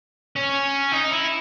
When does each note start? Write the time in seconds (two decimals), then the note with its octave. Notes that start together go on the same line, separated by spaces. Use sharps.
0.36 C#4
0.92 D#4
1.11 E4